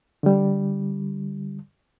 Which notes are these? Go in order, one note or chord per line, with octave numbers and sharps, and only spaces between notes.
D3 G3